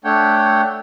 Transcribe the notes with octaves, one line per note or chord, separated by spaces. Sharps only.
A3 D4 C#5 F#5 G5